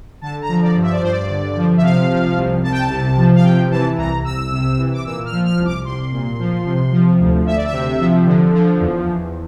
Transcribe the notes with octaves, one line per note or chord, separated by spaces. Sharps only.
D3 A5
A#5
F3
D5
G2
E5
D5
G2 C5
D5
D3
F3
E5
C3 F5
F3
C2
C2 A5
G5
A5
C3
F3
F5
C3 G5
E3 A5
C2 A#5
C2 E6
C3
E3
D6
A#2 E6
F6
F3
F6
C2
D6
C2 C6
A#2
F3
C3
F3
D2
D2 E5
D5
E5
C3
F3
D3
F3
E2
E2